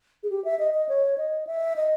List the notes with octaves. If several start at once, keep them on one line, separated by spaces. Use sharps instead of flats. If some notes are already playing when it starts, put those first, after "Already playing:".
G#4
G4
E5
D#5
D#5
C#5
D#5
E5
D#5